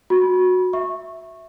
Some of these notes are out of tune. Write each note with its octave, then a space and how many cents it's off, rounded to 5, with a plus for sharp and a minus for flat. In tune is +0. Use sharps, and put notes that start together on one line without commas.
F#4 -15 B5 -25
E5 +0 C#6 -15